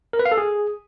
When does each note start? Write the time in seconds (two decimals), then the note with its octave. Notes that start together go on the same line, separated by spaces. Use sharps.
0.13 A#4
0.19 B4
0.25 F5
0.32 A4
0.38 G#4